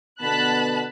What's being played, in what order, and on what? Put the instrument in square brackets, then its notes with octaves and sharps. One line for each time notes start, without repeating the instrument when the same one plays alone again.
[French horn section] B2 D3 B3 [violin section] A5 B5 F#6